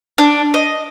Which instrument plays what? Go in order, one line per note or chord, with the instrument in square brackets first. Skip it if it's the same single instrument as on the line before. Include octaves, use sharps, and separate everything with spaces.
[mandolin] D4
D#5